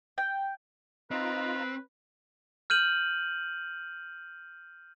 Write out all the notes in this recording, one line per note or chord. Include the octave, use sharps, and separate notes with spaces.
G5
C4 D#4 F4 B4 A#5
F6 G6 D#7 F#7